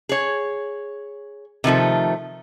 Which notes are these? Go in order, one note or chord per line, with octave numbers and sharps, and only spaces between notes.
G#4 C#5
C3 D#3 F3 A3